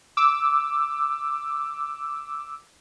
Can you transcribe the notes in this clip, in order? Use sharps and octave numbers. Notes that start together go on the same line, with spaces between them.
D6 E6